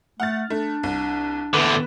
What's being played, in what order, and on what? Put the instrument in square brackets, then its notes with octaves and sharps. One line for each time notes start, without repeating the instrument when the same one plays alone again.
[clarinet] A3 [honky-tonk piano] F#5 F6 A6
[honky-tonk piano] A3 [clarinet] D4
[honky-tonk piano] C2
[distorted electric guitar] E2 D3 [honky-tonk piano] B4